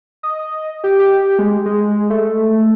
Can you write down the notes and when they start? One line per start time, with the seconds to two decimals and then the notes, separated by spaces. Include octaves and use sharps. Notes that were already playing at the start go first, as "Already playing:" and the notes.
0.23 D#5
0.84 G4
0.99 G4
1.39 G#3
1.66 G#3
2.10 A3